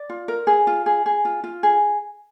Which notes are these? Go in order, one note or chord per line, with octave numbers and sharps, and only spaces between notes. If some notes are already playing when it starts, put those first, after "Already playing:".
Already playing: D5
F4
A#4
G#4
F4
G#4
G#4
F4
F4
G#4